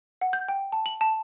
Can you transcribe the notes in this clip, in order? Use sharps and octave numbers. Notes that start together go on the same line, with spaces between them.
F#5
G6
G5
A5
F#7
A5